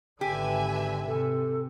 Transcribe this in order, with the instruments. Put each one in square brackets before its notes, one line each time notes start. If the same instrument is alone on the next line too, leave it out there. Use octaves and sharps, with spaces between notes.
[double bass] G#1 D3 [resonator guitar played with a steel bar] G4 [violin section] B4 E5 G#5
[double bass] C3 [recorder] A4